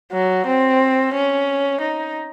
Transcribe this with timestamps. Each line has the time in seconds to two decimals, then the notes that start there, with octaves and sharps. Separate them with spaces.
0.13 F#3
0.46 C4
1.14 C#4
1.81 D#4